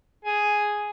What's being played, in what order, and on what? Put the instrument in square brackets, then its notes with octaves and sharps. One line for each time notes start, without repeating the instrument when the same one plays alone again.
[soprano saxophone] G#4